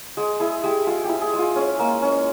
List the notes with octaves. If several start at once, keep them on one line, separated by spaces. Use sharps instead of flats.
G#3 G#4
E4 G#4
G#3 G4
G#3 F4
G4
E4
G#4
G#3
F4
C#4
A#3
C#4